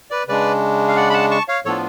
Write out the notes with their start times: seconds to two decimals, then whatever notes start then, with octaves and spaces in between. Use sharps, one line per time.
0.11 B4 D5
0.28 C#3 G#3 D4 B4 D5
0.88 F5
0.96 D5 F#5
1.09 B5
1.14 F#5 A5
1.31 A5 C#6
1.48 C#5 F5
1.65 A2 F3 B3 D4 F4 A4 C#5